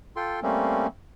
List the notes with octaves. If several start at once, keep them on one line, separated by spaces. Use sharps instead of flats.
F4 A4 G5 C6
G3 A3 A#3 C4 C#4